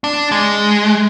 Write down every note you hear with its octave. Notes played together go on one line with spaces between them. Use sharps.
D4
G#3